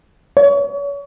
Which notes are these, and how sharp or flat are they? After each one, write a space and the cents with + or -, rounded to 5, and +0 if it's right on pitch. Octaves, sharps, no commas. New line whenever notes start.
C#5 +35